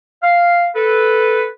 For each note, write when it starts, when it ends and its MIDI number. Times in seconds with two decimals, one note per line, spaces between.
0.23 0.68 77
0.76 1.47 69
0.76 1.47 71